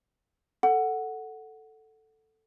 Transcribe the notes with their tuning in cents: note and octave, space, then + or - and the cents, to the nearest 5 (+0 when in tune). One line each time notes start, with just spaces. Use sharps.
A4 +0 F#5 +0